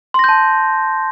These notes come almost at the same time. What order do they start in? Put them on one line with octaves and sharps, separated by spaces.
C6 A#6 G6 A5